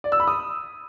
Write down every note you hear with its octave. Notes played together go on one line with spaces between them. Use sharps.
D5
E6
B5
D#6